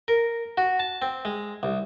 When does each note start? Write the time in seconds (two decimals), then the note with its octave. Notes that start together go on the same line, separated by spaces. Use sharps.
0.08 A#4
0.57 F#4
0.79 A5
1.02 C4
1.25 G#3
1.63 C2